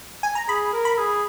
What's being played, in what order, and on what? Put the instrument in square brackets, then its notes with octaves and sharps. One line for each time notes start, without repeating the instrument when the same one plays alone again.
[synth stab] G#5
A#5
[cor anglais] G#4 [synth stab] B5
[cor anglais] A#4
[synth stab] B5
[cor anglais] G#4